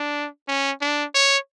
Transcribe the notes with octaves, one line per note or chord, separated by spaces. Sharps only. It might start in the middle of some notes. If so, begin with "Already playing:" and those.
Already playing: D4
C#4
D4
C#5